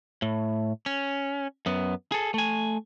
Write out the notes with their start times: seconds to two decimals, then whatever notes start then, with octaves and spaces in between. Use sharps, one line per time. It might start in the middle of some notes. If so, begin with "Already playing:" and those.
0.22 A2
0.86 C#4
1.66 F#2 B3
2.12 G#4 A4
2.34 A3 G#5